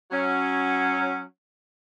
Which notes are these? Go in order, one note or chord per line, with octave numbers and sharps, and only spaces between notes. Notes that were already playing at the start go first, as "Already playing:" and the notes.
F#3 C#4